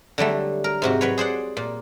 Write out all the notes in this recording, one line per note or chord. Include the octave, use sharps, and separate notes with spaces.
D3 F#3 G3 A3
A#4
G#2 C3 F#4
F#3 B4 C#5
G#4 C5 D5 F#5
A#2